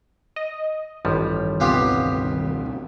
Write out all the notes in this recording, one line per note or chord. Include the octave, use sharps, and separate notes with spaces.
D#5
A1 G2 D#3 F3 G3
C#2 B2 B3 C4 F4 G4